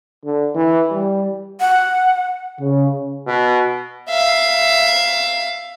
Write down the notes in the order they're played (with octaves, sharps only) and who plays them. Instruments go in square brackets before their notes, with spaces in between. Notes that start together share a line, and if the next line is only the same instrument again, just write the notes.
[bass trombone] D3
E3
G3
[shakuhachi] F#5
[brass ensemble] C#3
[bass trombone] B2
[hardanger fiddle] E5 F5